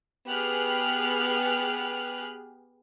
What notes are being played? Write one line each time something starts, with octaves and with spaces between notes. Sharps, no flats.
B3 G4 G#4 F6 F#6